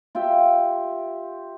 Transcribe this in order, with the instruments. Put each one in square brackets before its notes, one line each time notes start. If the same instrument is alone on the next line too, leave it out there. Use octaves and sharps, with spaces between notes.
[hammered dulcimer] F4 G4 E5 G5